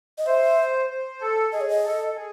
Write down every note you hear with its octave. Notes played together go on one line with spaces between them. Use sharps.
D#5
C5 E5
C5
A4
G#4 D#5
C#5
D#5
A4
G#4